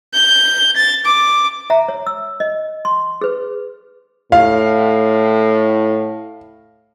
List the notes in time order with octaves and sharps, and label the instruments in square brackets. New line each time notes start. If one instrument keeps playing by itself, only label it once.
[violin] G6
A6
D6
[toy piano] E5 F#5 A#5
C#5
E6
D#5
C6
G#4 B4
[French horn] A2 [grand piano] F5